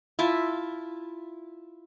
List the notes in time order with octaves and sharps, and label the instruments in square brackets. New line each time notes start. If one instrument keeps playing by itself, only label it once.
[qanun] E4 F4 E5 A5